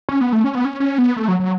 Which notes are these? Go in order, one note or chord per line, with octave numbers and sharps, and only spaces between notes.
C#4
B3
A3
C#4
B3
C#4
C#4
B3
A3
F#3
F#3